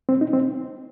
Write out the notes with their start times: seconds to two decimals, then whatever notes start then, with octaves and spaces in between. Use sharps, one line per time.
0.09 C4
0.21 D#4
0.33 C4